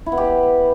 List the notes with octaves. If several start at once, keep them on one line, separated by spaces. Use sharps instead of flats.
E4
B3
G4